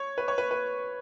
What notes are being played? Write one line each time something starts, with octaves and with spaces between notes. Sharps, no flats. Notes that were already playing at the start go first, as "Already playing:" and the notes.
Already playing: C#5
B4
C#5
B4
B4